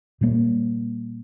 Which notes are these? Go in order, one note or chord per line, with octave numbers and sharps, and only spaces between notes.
A#2 G3 A#3